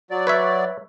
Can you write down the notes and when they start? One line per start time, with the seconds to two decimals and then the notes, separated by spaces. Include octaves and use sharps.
0.11 F#3 D5
0.27 B4 C#5 E5